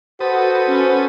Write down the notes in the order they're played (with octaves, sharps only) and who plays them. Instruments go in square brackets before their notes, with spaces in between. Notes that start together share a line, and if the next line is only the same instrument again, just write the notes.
[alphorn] F#4 [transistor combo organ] A4 B4 D#6 [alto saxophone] C5
[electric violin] C#4